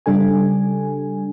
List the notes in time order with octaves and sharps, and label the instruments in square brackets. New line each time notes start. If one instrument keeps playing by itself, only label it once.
[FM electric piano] C#3 G3 D4 A4 G#5